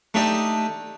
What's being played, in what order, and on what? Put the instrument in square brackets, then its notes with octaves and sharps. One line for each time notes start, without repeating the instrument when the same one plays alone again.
[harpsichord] A3 D4 D#4 G4 D5 D#5